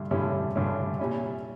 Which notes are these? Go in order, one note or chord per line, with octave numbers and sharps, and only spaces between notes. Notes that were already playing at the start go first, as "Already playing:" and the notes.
Already playing: G2 D3 E4
G2 D3 G3 C#4 E4
G2 D3 G3 C#4 E4
A#2 G3 C#4 E4